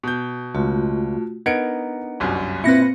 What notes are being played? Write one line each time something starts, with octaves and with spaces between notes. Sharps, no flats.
B2 G6
C#2 A3 F4 F#4
B3 D4 D#4 A#4 G#6 C#7 D7
G1 C2 F#2
A#2 C4 E4 B4 A#6 C#7